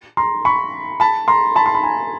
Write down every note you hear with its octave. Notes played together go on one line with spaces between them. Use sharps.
A#5 C6
B5 C#6
A5 B5
A#5 C6
A5 B5
C6
B5
G#5 A#5